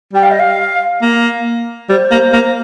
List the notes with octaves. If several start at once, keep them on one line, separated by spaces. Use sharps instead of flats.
G3 G5
F5
D#5
F5
A#3
G3 C5
A#3
A#3